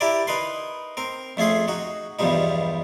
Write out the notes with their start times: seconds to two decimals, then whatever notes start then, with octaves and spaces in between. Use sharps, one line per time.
0.01 E4 G4 A#4 D5
0.27 D#4 A#4 B4 C6
0.97 C4 A#4
1.37 F2 A3 C#4 G#4 C6
1.68 D#4 F#4
2.19 E2 G2 B2 F3 G3 D#4